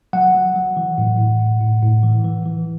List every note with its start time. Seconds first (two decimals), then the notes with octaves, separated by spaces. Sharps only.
0.13 F#3 F#5
0.35 F#3
0.56 F#3
0.77 E3
0.98 A2
1.19 A2
1.40 A2
1.61 A2
1.83 A2
2.03 E3
2.24 E3
2.45 E3